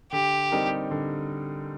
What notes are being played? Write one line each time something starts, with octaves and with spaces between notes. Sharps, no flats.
D3 G4
G3 C4 D#4 A#4
D3